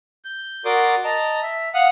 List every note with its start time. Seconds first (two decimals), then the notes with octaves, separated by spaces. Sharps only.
0.25 G6
0.65 F#4 A#4 D5 C6 D6 D#6
1.04 D#5 A5 A#5
1.42 E5
1.74 F5 F#5 D#6 F6